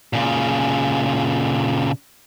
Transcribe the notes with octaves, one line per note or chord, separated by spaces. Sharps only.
A#2 C#3